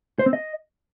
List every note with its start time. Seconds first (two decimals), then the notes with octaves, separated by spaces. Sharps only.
0.19 C5
0.26 C4
0.33 D#5